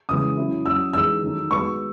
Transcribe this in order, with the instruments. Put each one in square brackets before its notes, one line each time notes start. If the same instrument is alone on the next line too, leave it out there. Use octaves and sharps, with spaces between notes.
[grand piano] C#3 E3 G#3 [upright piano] D#6
[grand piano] F#3 C#4 E4
[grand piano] F#3 C#4 F#4 [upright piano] E6
[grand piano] E3 G#3 D#4 G#4 [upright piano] E6
[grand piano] D#3 F#3 A3 D#4
[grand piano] B2 G#3 B3 F#4 [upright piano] C#6